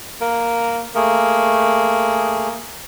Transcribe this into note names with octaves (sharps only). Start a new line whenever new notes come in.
A#3 A#5
A3 A#3 G#4